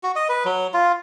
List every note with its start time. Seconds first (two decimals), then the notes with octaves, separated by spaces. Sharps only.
0.03 F#4
0.16 D#5
0.29 B4
0.45 F#3
0.74 F4